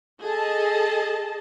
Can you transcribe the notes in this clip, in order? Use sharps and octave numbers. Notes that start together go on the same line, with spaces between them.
G#4 A4 D#5 A5